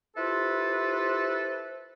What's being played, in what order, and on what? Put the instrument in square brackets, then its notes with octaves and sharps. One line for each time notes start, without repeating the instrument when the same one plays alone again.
[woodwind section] E4 F4 G4 A4 B4 C5